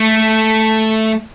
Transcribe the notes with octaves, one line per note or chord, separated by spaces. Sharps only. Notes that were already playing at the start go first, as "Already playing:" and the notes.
Already playing: A3